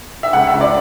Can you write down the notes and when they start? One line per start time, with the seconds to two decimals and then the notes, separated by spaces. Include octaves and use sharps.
0.23 E5
0.33 C#2 F#5
0.47 E5
0.54 C#2
0.61 D5